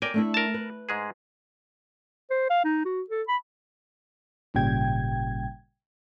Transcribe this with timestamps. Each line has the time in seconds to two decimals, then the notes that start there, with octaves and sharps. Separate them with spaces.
0.02 A#4 D5 G5 G#5
0.14 A3 D4 E4
0.34 A#4 A5
0.54 B4
0.89 G#2 G#3 G#4
2.31 C5
2.50 F5
2.64 D#4
2.85 F#4
3.10 A4
3.28 B5
4.54 G#1 A#2 C#3 G3 G5 G#6